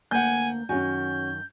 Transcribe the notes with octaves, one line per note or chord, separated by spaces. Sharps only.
D2 A#3 F#5 G#5 G6
F#2 D#3 C#4 F#4 G#5 G6